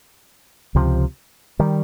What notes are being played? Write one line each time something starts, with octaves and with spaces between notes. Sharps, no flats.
C#2 C3 F3
D#3 G3